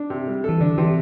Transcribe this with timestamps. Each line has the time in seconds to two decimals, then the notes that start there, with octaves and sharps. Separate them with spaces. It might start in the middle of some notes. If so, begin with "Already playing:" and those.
Already playing: D4
0.10 C3
0.28 G3
0.44 E3 A4
0.61 D3 D4
0.78 C3 E3